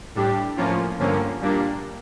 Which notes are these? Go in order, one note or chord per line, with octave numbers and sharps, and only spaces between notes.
A2 G3 D4 G4
A2 F3 A#3 C#4 F4
G2 D3 F3 A#3 C#4
A#2 G3 A#3 D4